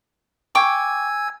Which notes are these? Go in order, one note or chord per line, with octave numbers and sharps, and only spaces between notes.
G5 G#5 C#6 D6 E6 G#6